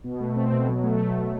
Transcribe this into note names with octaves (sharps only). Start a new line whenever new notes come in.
B2
A3
C4
B2
F#3
A3